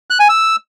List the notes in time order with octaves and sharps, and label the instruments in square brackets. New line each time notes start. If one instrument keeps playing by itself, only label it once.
[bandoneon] F#6
G#5
E6